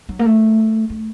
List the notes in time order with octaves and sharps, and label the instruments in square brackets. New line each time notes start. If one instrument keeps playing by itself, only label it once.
[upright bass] F#3
A#3
A3
A3